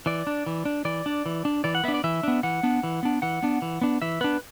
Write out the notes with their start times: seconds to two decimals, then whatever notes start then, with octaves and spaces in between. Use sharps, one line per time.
0.06 E3 D5
0.27 D4
0.46 E3
0.65 D4
0.85 E3 D5
1.06 D4
1.26 E3
1.45 D4
1.64 E3 D5
1.75 F#5
1.84 B3 D4 E5
1.94 D5
2.04 E3 E5
2.23 B3 D4
2.43 E3 F#5
2.63 B3 D4
2.83 E3
3.03 B3 D4
3.22 E3 F#5
3.43 B3 D4
3.62 E3
3.81 B3 D4
4.02 E3 E5
4.21 B3 D4 B4